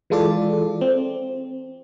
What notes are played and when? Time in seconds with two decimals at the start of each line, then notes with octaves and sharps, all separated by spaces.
0.10 E3 G#3 F4 A4 D5
0.81 C4